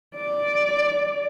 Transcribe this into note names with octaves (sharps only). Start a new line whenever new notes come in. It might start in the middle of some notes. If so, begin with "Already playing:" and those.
D5